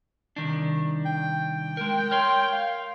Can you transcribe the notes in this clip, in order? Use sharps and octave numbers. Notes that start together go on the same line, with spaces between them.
C2 D#3 D4
G5
G#3 A#4
A#4 C#5 C6
F5